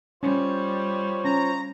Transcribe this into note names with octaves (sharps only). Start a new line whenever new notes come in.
G3 C#4 F4 C5 C#5
C#4 A#5